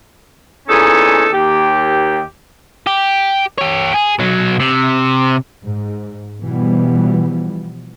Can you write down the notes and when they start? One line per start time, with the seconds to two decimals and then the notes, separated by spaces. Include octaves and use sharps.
0.68 E2 A#2 C#4 D#4 G#4 A4
1.33 D#2 G4
2.87 G4
3.58 G4 C#5
3.94 G#4
4.20 B1 F#3
4.61 C3
5.63 G#2
6.43 B2 E3 F3 G3 B3